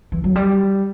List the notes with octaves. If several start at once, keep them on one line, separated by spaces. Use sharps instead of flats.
E3
F#3
G3